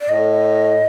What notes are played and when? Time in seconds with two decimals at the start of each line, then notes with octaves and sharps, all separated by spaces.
0.01 D5
0.09 A2 D#5